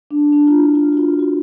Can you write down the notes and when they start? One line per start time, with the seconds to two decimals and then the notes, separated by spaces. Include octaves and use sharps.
0.11 D4
0.32 D4
0.47 F4
0.55 E4
0.76 F4
0.93 F#4
0.97 F4
1.19 F#4